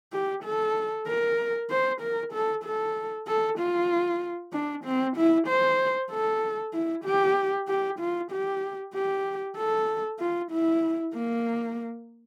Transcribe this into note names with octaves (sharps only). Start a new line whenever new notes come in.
G4
A4
A#4
C5
A#4
A4
A4
A4
F4
D4
C4
E4
C5
A4
E4
G4
G4
F4
G4
G4
A4
F4
E4
A#3